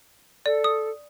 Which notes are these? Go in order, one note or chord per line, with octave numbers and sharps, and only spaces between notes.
A4 D5
D#6